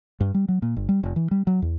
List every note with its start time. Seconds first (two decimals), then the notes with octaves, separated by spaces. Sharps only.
0.20 G2
0.34 G3
0.48 F#3
0.62 A#2
0.76 G1
0.89 G3
1.03 F1
1.16 E3
1.31 G3
1.47 F#3
1.62 E2